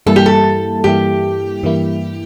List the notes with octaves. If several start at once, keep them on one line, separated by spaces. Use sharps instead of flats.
G2 E3 G3 A#3 E4 A4
G4
A4
G2 E3 G3 A#3 E4 G4
G2 E3 G3 A#3 E4